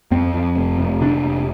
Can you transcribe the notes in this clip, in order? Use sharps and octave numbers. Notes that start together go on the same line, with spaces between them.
F2 C4
F2
F1
F1
C3 D4
F1